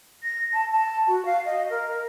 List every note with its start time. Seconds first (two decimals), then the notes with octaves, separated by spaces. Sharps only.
0.23 A#6
0.53 A5
0.72 A5
1.07 F#4
1.25 F5
1.46 D#5
1.70 A#4